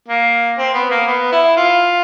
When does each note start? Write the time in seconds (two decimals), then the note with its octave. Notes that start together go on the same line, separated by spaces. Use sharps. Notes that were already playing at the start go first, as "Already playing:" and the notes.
0.08 A#3
0.58 C4
0.74 B3
0.90 A#3
1.07 B3
1.32 E4
1.57 F4